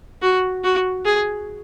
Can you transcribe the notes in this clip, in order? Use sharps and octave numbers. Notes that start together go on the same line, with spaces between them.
F#4
F#4
G#4